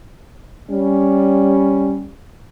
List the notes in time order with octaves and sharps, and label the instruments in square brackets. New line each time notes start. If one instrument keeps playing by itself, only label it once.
[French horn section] G3 C#4